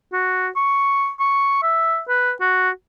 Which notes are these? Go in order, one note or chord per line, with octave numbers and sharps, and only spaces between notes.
F#4
C#6
C#6
E5
B4
F#4